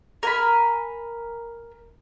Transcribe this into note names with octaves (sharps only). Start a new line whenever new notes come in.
A#4 G#5 B5